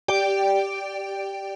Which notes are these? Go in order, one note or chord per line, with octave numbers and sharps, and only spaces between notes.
G4 D5 G5 D7